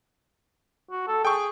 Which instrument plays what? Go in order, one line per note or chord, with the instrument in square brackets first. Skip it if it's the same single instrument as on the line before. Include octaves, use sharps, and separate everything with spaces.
[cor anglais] F#4
A4
[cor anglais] G#4 [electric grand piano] G5 C#6